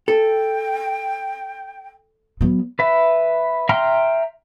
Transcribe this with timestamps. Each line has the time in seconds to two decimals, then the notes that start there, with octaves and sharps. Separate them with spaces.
0.08 A4 G5
2.41 F#3 B3
2.79 B4 E5
3.69 E5 G5 A#5 C6 F6